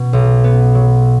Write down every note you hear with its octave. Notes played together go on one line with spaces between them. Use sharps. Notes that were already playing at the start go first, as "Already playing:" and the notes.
Already playing: B2
B1
B3
F#3